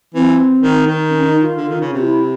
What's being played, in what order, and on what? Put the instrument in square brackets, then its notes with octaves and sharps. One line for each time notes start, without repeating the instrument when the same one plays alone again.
[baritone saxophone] E3 [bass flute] C4
[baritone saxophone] D#3
D#3
[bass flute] C#4
D#4
F4
[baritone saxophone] D3
D#3
C#3
[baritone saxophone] C3 [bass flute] F4
[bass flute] E4